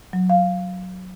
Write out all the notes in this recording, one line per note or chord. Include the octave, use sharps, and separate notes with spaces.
F#3
F5